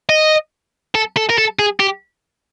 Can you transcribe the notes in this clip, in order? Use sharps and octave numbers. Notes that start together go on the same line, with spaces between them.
D#5
A4
A4
A#4
A4
G#4
G4